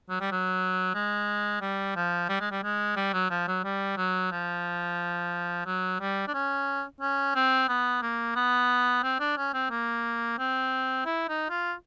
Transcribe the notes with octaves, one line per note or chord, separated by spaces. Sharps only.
F#3
G3
F#3
G#3
G3
F3
G3
G#3
G3
G#3
G3
F#3
F3
F#3
G3
F#3
F3
F#3
G3
D4
C#4
C#4
C4
B3
A#3
B3
C4
D4
C#4
C4
A#3
C4
E4
D#4
F4